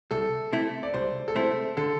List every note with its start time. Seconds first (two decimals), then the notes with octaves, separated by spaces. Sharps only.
0.11 C2 A4
0.53 C3 A3 E4
0.83 D5
0.94 C2 C5
1.28 A4
1.35 C3 A3 E4 C5
1.77 D3 A4